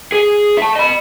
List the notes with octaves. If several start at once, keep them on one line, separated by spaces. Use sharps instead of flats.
G#4
E5 A5
D#5 B5